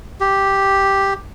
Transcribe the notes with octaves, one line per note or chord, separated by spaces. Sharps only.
G4